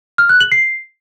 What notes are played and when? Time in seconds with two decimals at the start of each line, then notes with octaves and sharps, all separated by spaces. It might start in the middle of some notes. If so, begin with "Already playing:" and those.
0.18 F6
0.29 F#6
0.40 F#7
0.52 C7